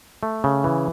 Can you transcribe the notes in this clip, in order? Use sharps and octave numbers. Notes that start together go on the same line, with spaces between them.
A3
C#3
E3